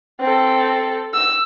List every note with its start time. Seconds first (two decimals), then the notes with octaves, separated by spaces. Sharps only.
0.20 C4 A4
1.14 E6